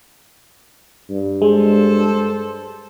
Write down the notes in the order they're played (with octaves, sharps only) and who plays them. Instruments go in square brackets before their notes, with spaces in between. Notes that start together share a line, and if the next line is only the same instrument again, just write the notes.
[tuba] G2
[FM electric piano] G#3 [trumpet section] A4 C5